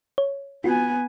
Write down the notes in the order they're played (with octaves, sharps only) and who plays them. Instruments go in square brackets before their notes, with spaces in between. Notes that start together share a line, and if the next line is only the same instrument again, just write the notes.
[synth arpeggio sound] C#5
[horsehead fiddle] B3 G#5 [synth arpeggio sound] F4 F#4